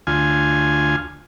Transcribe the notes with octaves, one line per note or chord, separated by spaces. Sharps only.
D2 F4 G#5